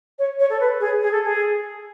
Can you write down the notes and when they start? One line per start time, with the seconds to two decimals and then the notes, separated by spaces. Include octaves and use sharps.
0.18 C#5
0.39 C#5
0.50 A4
0.60 B4
0.80 G#4
1.01 G#4
1.11 A4
1.23 G#4